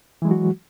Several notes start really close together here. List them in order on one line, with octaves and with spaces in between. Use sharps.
E3 G#3 F#3 F#4